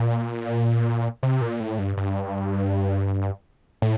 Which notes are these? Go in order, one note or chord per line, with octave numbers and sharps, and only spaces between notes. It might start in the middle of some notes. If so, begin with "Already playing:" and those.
Already playing: A#2
C3
A#2
A2
G2
G2
A2